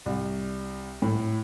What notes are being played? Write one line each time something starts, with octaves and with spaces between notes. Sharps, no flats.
C2
A2